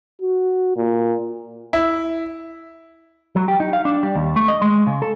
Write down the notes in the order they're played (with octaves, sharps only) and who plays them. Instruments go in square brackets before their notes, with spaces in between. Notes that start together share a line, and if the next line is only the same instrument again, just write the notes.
[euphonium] F#4
A#2
[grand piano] E4
[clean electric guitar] F#3
G4
D#4
F5
D4
G3
D#2
A3
D#5
G#3
C#3
A4